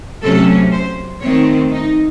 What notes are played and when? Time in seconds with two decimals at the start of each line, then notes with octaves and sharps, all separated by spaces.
0.22 C3 F#3 A3 C#4 A4
0.72 C5
1.22 D#3 A3 C4 C#5
1.72 D#4